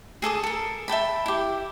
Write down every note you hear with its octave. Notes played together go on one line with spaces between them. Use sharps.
G#4 A4 C6 D#6
A4 A#4
E5 G5 A5 B5
E4 G4